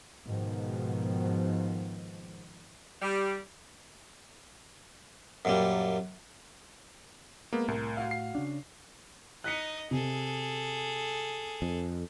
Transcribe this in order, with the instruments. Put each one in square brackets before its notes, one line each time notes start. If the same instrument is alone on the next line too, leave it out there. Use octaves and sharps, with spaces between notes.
[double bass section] G#2 B2 D#3 F3
[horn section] G3
[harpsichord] F#2 A#2 G3
[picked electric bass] G#3 [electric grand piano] A#3 B3
[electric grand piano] C2 [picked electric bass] A2 [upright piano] A#4
[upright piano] F#4 F5
[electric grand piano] C7
[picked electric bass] C#3 C#4 D4
[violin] D#4 D#5 [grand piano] F#6 B6 C#7
[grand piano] C3 [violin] G#4 A4
[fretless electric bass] F2